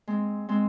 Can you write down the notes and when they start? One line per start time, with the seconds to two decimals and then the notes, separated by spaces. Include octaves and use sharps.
0.07 G#3 C4
0.49 G#3 C4